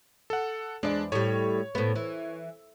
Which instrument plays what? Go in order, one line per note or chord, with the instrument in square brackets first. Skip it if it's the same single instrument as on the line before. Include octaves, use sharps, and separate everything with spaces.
[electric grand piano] A4 F#5
[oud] E2 D5 [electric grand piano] G#3 D4
[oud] A2 G3 [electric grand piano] C#5
[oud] A2 B3
E3